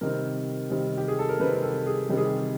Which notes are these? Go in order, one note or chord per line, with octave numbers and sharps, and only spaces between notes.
C3 D#3 G3 C4 A#4
C3 D#3 G3 C4
G4
G#4
A4
A#4
C3 D#3 G3 C4 B4
A#4
A4
G#4
C3 D#3 G3 C4 G4
G#4
G4